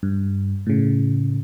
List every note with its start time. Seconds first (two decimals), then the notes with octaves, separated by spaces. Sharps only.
0.03 G2
0.67 A2 C#3